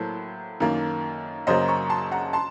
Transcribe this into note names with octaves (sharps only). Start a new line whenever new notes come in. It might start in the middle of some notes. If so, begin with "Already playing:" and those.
Already playing: A2 F#3 A#3 A4 C5
F#2 D#3 A#3
F#2 C#3 F#3 A#3 C5 D#5
A#5 C#6
A5 C6
F#5 A#5
A5 C6